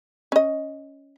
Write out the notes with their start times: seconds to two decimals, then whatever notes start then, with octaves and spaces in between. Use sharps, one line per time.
0.32 C#4 D#5